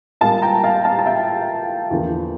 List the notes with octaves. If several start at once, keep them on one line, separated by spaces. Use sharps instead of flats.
A#2 G3 A#3 F5 A5
G5 A#5
F5 A5
F5 A5
A5
E5 G5
E2 D3 F3 A#3